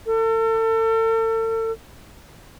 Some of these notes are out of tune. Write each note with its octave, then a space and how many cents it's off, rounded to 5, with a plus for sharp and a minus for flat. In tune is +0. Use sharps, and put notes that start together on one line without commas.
A4 +40